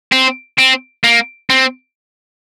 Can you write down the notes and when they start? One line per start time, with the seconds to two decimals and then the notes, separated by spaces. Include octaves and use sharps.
0.12 C4
0.59 C4
1.04 A#3
1.50 C4